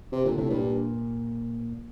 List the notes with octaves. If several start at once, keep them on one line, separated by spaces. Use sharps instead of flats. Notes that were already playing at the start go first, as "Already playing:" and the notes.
C3
A#2 D3
A2 C3
G2 A#2